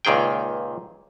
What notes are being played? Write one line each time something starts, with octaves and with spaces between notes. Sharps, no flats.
C#2 A#2 D#3 G#4 G5